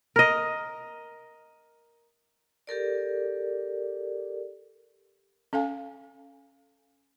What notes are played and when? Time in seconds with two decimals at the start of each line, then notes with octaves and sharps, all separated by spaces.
0.16 A#4 D#5
2.67 G4 A4 A#4 D5
5.53 C#4 A4 F5 G#5